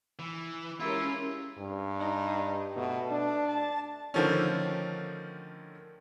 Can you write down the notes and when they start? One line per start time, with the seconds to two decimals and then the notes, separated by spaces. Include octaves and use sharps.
0.19 E3
0.80 G#3 C#4 E4 F4 G4 A#4
1.58 G2
1.99 D#4
2.76 B2 A3
3.11 D4
3.46 A5
4.14 D3 D#3 F3 A3 C#4